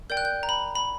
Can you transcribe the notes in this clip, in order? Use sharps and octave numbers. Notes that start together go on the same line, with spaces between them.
A#4 D5 G5 G6
F#6
G6
A#5
B5
B5